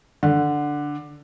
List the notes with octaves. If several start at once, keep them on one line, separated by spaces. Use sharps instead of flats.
D3